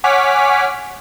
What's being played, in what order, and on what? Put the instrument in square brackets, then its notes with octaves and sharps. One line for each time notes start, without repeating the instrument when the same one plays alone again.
[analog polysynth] C#5 F#5 G#5 D6 F6 B6